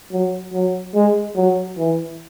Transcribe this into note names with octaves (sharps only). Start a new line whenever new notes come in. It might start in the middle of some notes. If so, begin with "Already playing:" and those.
F#3
F#3
G#3
F#3
E3